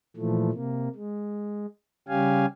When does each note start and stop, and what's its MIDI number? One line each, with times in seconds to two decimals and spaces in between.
0.17 0.51 46
0.17 0.51 52
0.17 0.51 53
0.17 0.51 57
0.53 0.88 48
0.53 0.88 58
0.96 1.66 56
2.08 2.46 49
2.08 2.46 55
2.08 2.46 61
2.08 2.46 67
2.08 2.46 77
2.08 2.46 80